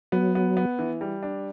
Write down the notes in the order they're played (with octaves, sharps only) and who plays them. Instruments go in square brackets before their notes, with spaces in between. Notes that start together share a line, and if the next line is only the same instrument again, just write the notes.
[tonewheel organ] F#3 [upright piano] B3
[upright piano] B3
B3
E3
G3
D4